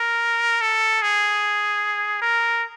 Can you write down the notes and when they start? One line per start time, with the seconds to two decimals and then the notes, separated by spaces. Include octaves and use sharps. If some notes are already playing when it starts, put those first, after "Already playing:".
Already playing: A#4
0.61 A4
1.02 G#4
2.22 A#4